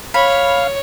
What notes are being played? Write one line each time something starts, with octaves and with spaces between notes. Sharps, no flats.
C#5 F5 B5